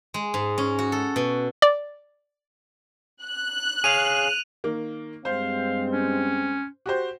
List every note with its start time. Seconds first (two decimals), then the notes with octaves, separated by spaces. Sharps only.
0.14 G#3
0.34 G#2
0.58 C#4
0.79 F#4
0.92 A4
1.16 B2
1.62 D5
3.24 F#6
3.84 G#4 C#5 F5 D#7 F7
4.64 D#3 A#3
5.25 G2 G#3 C4 C5 F5
5.90 C#4
6.86 F#4 G4 C5